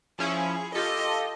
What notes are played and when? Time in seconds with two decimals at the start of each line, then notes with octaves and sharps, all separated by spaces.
0.19 F3 C#4 E4 G#4
0.75 F4 G4 A4 D#5